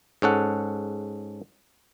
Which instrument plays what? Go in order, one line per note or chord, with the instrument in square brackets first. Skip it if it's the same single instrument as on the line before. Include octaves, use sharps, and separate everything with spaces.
[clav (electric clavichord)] G#2 C#4 A4 F#5